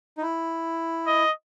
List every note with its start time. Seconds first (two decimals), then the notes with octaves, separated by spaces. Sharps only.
0.17 D#4
0.22 E4
1.07 D#5